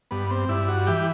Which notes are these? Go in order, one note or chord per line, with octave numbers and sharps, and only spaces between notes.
G2 B3
C4
G2 E4
F#4
E3 G4